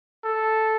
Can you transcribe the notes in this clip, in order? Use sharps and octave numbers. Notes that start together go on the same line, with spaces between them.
A4